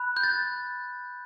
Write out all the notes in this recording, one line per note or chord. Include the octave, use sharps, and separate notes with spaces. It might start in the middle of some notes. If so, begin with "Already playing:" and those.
Already playing: B5 F#6
G6
A6